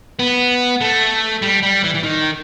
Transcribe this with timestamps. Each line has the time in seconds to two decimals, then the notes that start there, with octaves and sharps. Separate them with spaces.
0.20 B3
0.81 A3
1.42 G3
1.63 G3
1.84 E3
1.94 E3
2.03 D#3